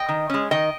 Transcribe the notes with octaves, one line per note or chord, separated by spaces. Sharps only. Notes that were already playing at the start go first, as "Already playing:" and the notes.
Already playing: D#5 G5
D#3
G#3 C#4
D#3 D#5 G5